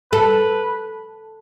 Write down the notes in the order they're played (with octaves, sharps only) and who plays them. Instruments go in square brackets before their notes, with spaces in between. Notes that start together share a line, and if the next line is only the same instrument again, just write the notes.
[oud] A4 [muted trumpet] B4